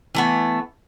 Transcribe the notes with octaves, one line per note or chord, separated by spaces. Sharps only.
E3 A3 B3